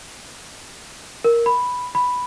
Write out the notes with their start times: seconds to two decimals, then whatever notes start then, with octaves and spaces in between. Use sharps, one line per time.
1.24 A#4
1.46 B5
1.95 B5